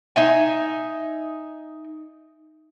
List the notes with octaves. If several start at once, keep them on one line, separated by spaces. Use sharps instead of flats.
D#4 E5 G#5